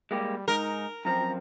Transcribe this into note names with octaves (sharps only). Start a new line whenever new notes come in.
G3 G#3 A#3 G4
G#2 D#4 A#4
F#2 F3 C4 A#5